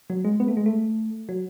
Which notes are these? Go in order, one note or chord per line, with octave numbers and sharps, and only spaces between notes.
F#3
G#3
B3
A3
G#3
A3
F#3